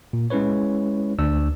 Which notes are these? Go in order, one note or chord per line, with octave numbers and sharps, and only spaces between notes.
A#2
G#3 C#4 E4 B4 C#5
D2 D4 D5 E6